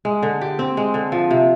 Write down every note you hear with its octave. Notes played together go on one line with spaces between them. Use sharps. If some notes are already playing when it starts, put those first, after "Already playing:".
G#3
D3
G4
C4
G#3
D3
F3
C3